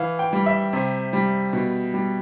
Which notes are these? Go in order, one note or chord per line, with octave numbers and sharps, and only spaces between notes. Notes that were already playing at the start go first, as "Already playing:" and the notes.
Already playing: E3 F5
G5
G3
E5
C3
G3
B2
G3